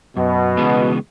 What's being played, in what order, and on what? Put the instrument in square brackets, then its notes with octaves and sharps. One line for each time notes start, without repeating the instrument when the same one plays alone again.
[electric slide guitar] F#2 [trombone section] B2
[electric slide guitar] C#3 E3 G#3 B3